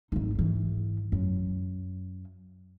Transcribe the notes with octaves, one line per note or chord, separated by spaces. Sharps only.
G#1 D#4
G#2 E3
F#2